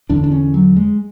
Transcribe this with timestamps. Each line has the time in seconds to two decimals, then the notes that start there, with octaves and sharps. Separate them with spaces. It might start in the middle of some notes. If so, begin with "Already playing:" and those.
0.09 E2 D3 D4
0.24 D4
0.32 C#4
0.54 F#3
0.76 G#3